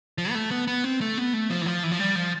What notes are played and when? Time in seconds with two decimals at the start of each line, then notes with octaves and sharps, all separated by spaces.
0.18 F3
0.30 B3
0.35 A3
0.51 B3
0.67 B3
0.84 C4
1.01 A3
1.18 B3
1.34 A3
1.50 F3
1.61 E3
1.66 F3
1.83 E3
1.92 F3
1.99 G3
2.15 F3